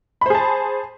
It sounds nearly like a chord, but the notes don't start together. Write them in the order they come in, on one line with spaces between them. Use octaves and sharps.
B5 C5 G#4 A5